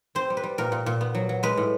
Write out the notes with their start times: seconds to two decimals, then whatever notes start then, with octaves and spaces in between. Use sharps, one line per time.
0.15 C4 C5
0.30 G3
0.37 B4
0.44 G3
0.58 A#2 A#4
0.72 A#2
0.86 A#2
1.01 B3
1.15 F#3
1.29 F#3
1.43 G#3 B4
1.57 A2